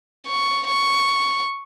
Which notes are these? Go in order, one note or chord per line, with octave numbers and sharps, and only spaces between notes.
C#6
C#6